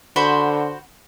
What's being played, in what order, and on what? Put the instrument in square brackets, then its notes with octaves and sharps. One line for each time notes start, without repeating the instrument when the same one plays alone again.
[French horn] D3 [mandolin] F#4 C5 B5